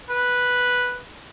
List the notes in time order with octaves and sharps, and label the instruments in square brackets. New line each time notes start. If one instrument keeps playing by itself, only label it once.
[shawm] B4